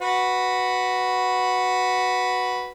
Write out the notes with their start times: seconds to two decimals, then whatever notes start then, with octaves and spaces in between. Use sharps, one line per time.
0.01 F#4 B4